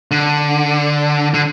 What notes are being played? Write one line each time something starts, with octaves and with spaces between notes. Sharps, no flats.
D3
D3